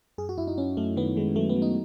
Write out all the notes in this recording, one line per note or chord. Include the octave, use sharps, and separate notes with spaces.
F#2 G#4
F#4
F#2 E4
D#4
F#2 C#4
F#2 A3
D#3 B3
D#3 G#3
F#3 A3
B3
F#3
D#4